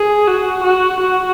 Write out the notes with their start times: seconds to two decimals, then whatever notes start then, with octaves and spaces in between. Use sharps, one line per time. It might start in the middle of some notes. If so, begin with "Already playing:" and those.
Already playing: G#4
0.28 F#4
0.63 F#4
1.00 F#4